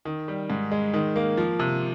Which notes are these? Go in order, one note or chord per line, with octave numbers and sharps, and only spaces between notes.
D#3
G3
G#2
G#3
D#3
A#3
F3
C3